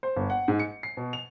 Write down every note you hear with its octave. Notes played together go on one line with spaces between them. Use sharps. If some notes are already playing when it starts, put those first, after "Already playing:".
C5
G1
F#5
G#2
C#7
C7
B2
F7